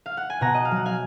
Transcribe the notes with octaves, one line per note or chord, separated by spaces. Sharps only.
F5
F#5
G#5
B2 F#5 A#5
D#5
F5
F#3 F#5
F5 G#5